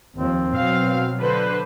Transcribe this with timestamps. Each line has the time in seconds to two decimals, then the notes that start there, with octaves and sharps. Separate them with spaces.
0.16 D#2 F3 C4
0.56 B2 F#3 F5
1.20 D3 B4 C5